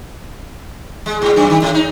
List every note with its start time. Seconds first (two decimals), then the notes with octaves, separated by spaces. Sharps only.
1.06 G#3
1.22 G#2
1.36 F#2
1.50 D#3
1.62 A2
1.74 D#4